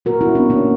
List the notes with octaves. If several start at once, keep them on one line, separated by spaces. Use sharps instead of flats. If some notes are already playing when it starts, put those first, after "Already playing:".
A#2 A#3 F#4 A#4
C#4 E4
B3 D4
A#3 C#4